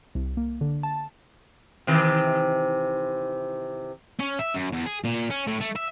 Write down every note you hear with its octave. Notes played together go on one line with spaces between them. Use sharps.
C2
A#3
D3
A5
C3 D#3 E3
C#4
E5
F#2
E2
G#4
A#2
C#4
A2
A3
E5